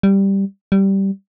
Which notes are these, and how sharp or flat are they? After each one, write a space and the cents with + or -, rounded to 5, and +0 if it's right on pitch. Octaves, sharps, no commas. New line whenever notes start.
G3 +0
G3 -10